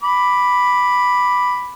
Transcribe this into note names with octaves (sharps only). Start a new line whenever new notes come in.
B5 D6